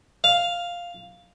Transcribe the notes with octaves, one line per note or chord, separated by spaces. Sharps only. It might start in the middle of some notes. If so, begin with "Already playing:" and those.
F5